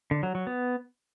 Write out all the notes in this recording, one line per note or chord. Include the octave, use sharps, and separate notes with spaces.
D3
F#3
F#3
B3